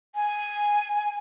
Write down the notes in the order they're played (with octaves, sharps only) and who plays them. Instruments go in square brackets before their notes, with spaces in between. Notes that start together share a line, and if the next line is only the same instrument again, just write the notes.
[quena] G#5